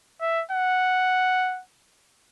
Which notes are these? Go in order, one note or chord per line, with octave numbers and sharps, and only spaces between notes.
E5
F#5